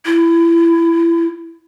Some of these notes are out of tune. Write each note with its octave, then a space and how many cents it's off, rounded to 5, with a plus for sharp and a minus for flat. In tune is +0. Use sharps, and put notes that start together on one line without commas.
E4 +25